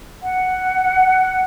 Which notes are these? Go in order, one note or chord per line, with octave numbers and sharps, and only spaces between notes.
F#5